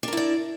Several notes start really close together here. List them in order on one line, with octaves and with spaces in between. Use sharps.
D4 A#4 E4 D5